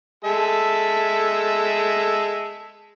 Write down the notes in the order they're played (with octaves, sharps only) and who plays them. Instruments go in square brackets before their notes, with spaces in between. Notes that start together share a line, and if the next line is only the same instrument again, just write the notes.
[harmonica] G#3 A4 E5